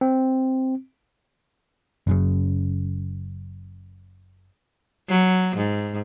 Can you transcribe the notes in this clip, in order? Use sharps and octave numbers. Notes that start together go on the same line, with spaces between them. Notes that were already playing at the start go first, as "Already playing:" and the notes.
C4
F#1 F#2 C#3
F#3
G#2